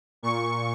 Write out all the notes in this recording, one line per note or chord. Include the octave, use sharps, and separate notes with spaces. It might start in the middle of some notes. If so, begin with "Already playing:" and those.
A#2 C#6